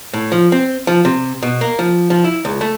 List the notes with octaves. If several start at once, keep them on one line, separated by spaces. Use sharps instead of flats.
A2
F3
C4
F3
C3
B2
A#3
F3
F3
E4
C#2
A3